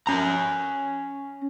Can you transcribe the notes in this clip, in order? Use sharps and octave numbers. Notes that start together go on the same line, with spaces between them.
C#4 A#5